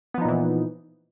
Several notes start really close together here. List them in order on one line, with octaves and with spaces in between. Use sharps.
B3 F3 D#4 A#2 E3